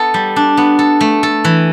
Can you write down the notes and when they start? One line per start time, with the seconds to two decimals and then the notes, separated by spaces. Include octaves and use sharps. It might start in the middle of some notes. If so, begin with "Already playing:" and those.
Already playing: B3 A4
0.14 G3
0.36 D4
0.57 B3
0.79 A4
1.01 A3
1.23 A4
1.44 E3